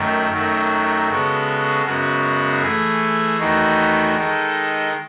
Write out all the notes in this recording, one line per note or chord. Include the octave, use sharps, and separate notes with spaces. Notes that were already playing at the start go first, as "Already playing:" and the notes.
Already playing: F#2 D#3 A3
F#2 D#3 F#3 A3
C#3 G#3 B3 F#4 A4
F#2 C#3 G#3 B3 F#4
E3 A3 E4 G#4
E2 D#3 A3 D#4 F#4
D#3 G#3 D#4 A4